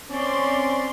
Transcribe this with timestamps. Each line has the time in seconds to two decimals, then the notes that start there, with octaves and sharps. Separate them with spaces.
0.11 C4 C#4 D5 C6